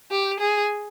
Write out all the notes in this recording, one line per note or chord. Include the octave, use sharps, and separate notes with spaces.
G4
G#4